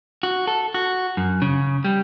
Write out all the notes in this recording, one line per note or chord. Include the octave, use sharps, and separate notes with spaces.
F#4
A4
F#4
F#2
C#3
G3